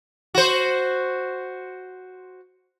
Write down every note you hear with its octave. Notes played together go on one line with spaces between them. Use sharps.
F#4 C5